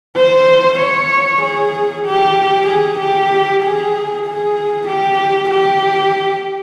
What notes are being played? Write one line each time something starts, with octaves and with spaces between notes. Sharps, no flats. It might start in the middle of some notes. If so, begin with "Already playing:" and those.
C5
C#5
G#4
G4
G#4
G4
G#4
G#4
G4
G4